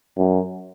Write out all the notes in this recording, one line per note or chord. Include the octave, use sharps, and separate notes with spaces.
F#2